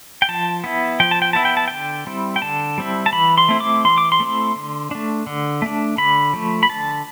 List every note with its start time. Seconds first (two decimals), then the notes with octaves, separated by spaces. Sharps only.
0.22 G5
0.29 F3 A5
0.64 B3 E4
1.00 F3 G5
1.11 A5
1.22 G5
1.33 B3 E4 A5
1.45 G5
1.57 A5
1.68 D3 G5
2.07 G3 C4 E4
2.36 G5
2.42 D3 A5
2.78 G3 C4 E4
3.06 A5
3.13 E3 B5
3.38 C6
3.49 A3 C4 E4
3.60 D6
3.85 E3 C6
3.98 D6
4.12 C6
4.20 A3 C4 E4
4.56 D3
4.91 A3 D4
5.27 D3
5.62 A3 D4
5.98 D3 B5
6.33 F3 A3
6.63 B5
6.69 D3 A5